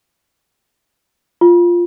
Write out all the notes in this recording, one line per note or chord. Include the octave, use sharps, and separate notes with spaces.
F4